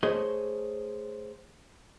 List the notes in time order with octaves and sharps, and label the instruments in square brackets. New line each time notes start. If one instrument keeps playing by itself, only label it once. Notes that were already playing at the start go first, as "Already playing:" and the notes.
[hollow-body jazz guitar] A3 G#4 C5 C#5 D#5